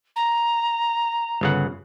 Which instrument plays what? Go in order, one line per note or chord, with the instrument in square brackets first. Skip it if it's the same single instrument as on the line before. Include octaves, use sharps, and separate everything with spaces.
[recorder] A#5
[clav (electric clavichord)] G1 C#3 F#5